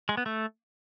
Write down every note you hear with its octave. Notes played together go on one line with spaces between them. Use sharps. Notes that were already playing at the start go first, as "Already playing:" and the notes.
G#3
B3
A3